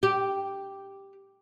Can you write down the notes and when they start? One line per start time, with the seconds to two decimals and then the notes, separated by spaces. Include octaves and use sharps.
0.03 G4